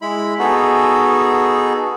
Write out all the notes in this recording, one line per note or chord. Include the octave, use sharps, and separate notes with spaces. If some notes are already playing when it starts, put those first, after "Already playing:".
G#3 E4 B5
B3 D#4 F#4 G#4 A4